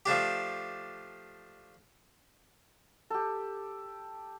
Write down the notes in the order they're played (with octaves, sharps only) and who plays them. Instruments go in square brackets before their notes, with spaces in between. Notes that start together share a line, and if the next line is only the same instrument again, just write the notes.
[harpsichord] F3 A3 D4 G4
[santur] G4 A4